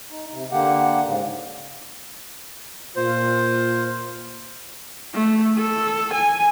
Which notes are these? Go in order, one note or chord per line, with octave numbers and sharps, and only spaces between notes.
D#4
C3
D3 A#3 G4 F#5
G#2 C#3
A#2 F4 C5
A3
A4
G#5